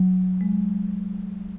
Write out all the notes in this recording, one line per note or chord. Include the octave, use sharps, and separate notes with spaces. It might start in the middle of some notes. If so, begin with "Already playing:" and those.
Already playing: F#3
G#3